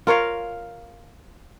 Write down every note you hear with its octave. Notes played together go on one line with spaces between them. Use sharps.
F4 A#4 C#5 F5